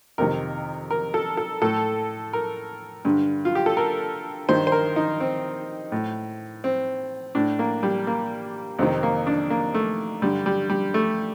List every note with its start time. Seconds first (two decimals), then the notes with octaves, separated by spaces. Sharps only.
0.18 F2 C3 D#3 A#4
0.90 A#4
1.14 A4
1.37 A4
1.62 A2 A4
2.33 A#4
3.05 G2 D3
3.45 F4
3.55 G4
3.66 A4
3.77 A#4
4.49 G2 D#3 C5
4.67 C5
4.72 A#4
4.96 D#4
5.20 C4
5.92 A2
6.64 C4
7.35 A2 D4
7.59 A#3
7.83 G3
8.07 A#3
8.79 F2 C3 D#3 C4
9.03 A#3
9.27 D4
9.50 A#3
9.74 A3
10.22 G2 D3 G3
10.46 G3
10.70 G3
10.94 A3